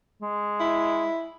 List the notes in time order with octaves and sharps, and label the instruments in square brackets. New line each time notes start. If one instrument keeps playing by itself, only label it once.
[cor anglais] G#3
[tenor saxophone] E4